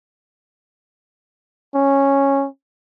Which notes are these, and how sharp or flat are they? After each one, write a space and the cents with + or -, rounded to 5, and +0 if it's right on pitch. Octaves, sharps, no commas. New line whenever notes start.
C#4 -10